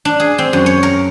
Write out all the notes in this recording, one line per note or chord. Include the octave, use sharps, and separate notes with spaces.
D4
G#4
C4
F#2
C#5
A#4